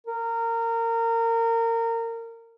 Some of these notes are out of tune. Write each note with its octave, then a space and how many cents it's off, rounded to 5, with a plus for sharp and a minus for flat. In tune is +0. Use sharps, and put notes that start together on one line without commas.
A#4 -25